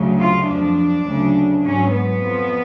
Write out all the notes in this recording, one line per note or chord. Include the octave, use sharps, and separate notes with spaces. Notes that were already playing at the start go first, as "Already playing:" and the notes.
Already playing: D2 C#3 F#3
F4
F2 F3 D4
D2 C#3 F#3
G#2 F#3 C#4
B3
F2 F3